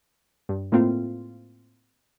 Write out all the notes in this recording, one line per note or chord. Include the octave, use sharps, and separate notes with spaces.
G2
A2 A#3 C4 F4